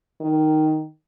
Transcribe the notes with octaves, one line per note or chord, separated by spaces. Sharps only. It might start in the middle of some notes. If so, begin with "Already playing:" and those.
D#3